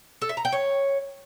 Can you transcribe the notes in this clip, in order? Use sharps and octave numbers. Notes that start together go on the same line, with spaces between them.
A4
E5
A#5
G5
C#5